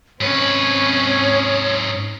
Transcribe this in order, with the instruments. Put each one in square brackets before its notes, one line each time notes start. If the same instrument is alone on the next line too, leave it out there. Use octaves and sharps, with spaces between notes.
[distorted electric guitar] G#2 B4 [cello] C4 C#4 [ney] C#5